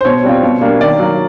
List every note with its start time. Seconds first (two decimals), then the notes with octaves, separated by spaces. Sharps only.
0.01 C5
0.05 B2 C#5
0.24 G3 C4 F4
0.43 B2
0.61 G3 A#3 D4
0.81 D#3 D5
0.99 F#3 A#3